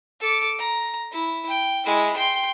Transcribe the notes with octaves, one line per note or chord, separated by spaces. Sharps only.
A4 D6
A#5
E4
G5
G#3 E4
G5 C6